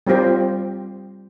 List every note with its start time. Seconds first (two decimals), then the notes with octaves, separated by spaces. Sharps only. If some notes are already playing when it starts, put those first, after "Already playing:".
0.07 G3 C4 F4 G4 C5